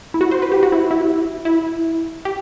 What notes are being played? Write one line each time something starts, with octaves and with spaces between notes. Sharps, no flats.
E4
F#4
C5
B4
G4
F#4
E4
E4
E4
G4